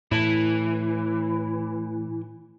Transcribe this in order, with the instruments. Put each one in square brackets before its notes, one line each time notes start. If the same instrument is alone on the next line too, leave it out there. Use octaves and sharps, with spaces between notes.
[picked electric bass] A2 [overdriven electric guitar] E3